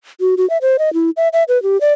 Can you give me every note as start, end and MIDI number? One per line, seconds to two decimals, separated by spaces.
0.20 0.35 66
0.37 0.48 66
0.50 0.58 76
0.62 0.77 72
0.79 0.92 75
0.93 1.10 64
1.17 1.28 76
1.33 1.44 76
1.48 1.61 71
1.63 1.80 67
1.81 1.93 74